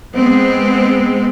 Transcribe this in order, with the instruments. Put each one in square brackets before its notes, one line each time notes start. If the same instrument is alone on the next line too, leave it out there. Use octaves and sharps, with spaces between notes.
[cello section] G#3 B3 C4